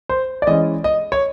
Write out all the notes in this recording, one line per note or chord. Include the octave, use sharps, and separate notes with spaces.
C5
D5
E3 G#3 C#4 D#5
D#5
C#5